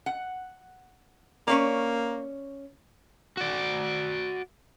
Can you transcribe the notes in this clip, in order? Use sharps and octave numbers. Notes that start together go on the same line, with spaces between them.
F#5
A#3 C#4 C#5 D5
F#4 D5